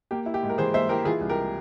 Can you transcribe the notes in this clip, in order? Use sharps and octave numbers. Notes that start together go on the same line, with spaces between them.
A#3 G4
E4
G4
G#2
A#4
E3 G#4 C5
A#3 C5 E5
E4 G4 A#4
E3 F4 G#4
C2
G4 A#4